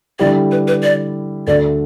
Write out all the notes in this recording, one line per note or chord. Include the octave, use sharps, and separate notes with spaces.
D3 G3 E4 G4 D5
B4
B4
D5
D2 D3 A3 D5